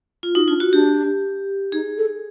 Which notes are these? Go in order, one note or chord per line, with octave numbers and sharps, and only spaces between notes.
F4
D#4 F#4
D4 F4
F#4
D4 G4
D#4 G#4
A4